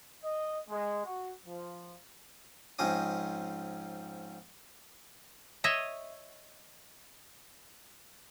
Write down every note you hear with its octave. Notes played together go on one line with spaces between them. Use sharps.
D#5
G#3
F#4
F3
G#2 F3 C4 C#4 D#5 D#6
C#5 D#5 E5